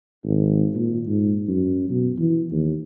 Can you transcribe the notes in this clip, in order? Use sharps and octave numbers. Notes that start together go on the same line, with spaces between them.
G#1
A#2
G#2
F#2
B2
E3
D#2